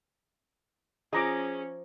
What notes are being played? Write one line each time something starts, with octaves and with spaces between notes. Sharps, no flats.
F3 C#4 G#4 D5 D#5 A#5 D6